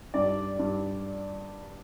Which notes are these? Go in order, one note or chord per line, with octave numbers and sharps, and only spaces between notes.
G2 D5
G2